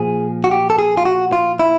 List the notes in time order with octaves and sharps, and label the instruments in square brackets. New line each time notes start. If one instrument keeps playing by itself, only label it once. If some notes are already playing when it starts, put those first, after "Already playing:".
Already playing: [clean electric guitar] A#2 F3 G#4
F#4
G4
A4
G#4
F4
F#4
F4
E4